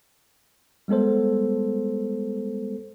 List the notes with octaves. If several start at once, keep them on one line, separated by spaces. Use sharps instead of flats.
G3 G#3 B3 A4 C5